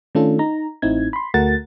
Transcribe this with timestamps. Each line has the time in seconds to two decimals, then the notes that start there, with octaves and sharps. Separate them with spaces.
0.15 D#3 A3 C#4 D4 F4 A4
0.39 D#4 A#5
0.82 A1 A2 C4 D#4 E4 G#6
1.13 B5 C6
1.34 D2 A3 F#4 A#4 F#5 A6